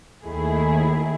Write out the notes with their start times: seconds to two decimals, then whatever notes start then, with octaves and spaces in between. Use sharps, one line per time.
0.24 D#2 D#3 A3 E4 G#4